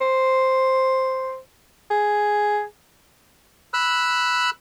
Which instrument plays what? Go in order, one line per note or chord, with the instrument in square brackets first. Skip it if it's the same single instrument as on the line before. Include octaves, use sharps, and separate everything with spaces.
[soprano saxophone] C5
G#4
[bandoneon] B5 E6 F#6